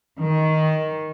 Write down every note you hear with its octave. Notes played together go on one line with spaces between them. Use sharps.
D#3